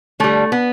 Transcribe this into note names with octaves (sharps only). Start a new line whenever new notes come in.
D3 G3 A3
B3